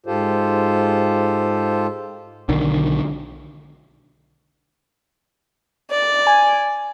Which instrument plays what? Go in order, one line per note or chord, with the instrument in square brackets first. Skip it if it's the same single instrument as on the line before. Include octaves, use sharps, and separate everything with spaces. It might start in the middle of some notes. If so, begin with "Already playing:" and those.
[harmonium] G#2 F4 G4 A4 C5
[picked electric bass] B1 D3 D#3
[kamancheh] D5
[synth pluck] G#5